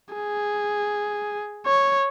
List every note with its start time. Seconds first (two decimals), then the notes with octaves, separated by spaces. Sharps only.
0.15 G#4
1.67 C#5